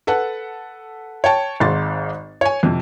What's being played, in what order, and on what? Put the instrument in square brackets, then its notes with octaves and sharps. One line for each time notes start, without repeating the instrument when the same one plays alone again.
[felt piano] A4 B4 F#5 A5
C#5 G5 A5
G#1 G#2 C6 A6
C#5 G#5
F2 C3